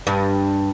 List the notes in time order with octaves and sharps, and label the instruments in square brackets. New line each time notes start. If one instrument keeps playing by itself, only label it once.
[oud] G2